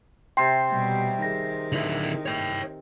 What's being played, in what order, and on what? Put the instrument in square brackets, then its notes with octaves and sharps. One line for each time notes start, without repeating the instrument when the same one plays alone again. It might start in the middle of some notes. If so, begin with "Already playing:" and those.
[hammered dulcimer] C3 C6 [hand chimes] G5
[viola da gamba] B2 G3
[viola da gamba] D#3 [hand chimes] G#4 A#6
[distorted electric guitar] D3 E4
C#5 G5